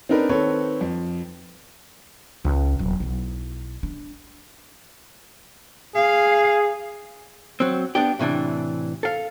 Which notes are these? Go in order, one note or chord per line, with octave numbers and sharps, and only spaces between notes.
C4 D4 D#4 A#4 B4
D#3 C4 A4 B4 C#5
F2
C#2
D#1 F#3
B1 E4
G#3 D4
G#4 F5
F#3 C4
B3 D4 G4
A2 C3 E3 D4
A4 F5